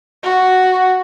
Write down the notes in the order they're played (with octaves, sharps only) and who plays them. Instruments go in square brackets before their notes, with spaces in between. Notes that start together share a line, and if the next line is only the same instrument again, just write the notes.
[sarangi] F#4